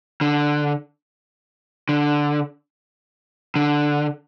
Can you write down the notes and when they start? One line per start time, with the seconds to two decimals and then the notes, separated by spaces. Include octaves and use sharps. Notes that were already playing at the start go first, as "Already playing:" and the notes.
0.21 D3
1.89 D3
3.56 D3